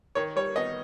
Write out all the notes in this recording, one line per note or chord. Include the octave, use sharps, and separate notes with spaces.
D#3 C#5
G3 C#5
B3 D#5